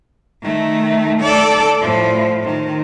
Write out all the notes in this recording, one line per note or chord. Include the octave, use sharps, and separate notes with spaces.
D#3 A3
A4 D5
A2 F3
D#3